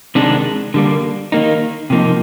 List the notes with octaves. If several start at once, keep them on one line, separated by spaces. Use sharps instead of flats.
C3 D#3 G#3 D4
D3 G3 A#3
D#3 A#3 D#4
C3 F3 A#3 D#4